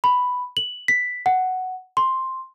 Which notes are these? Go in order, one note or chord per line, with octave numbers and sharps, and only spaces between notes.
B5
F#7
B6
F#5
C6